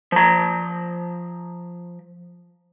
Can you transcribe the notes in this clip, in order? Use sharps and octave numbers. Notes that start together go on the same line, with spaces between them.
F3 A#5